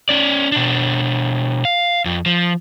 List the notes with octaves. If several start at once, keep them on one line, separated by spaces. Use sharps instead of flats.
C#4 D5
B2 D4
F5
F2
F3